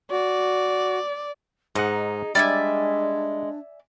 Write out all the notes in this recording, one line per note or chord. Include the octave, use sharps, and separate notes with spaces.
F#4 D5
G#2 D#4 G#4 F#5
G3 G#3 D4 D5 E5 G#5